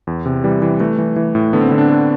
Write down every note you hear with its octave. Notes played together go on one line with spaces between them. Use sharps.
E2
C3
E3 G3
E3
E3 A3
E3
E3
A2
D3 B3
C4
D3 B3
D4
D3